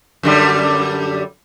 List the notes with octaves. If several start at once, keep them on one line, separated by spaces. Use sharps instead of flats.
F#2 D3 G3